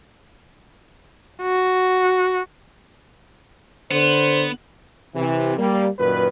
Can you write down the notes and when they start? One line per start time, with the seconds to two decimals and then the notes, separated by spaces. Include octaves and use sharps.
1.42 F#4
3.91 D3 B3 C5
5.15 C3 E3
5.58 G3 A#3
5.99 F#2 A#2 D#3 B4